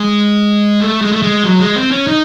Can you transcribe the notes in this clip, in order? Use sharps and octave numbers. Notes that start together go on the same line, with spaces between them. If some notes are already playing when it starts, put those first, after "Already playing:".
Already playing: G#3
A3
G#3
A3
G#3
F#3
G#3
C4
C#4
D#4